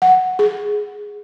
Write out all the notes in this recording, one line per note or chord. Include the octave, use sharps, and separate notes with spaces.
F#5
G#4